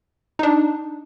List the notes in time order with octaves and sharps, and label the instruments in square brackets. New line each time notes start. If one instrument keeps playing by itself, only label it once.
[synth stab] D4 D#4